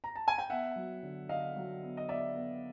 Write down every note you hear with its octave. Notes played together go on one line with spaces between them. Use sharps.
A#5
A5
G#5
G5
B3 E5 F#5
F#3
D3
D3 D#5 F5
F#3
B3
D#5
B3 D5 E5
B3